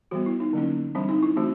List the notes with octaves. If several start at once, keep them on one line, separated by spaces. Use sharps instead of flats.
E3 G3 B3 F#4
E4
D#4
D3 F#3 A#3 C#4
E3 G3 C4 D4
D#4
E4
E3 A3 C4 F#4